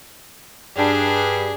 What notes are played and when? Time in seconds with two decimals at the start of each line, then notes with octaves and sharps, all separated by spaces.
0.76 G2 D4 G#4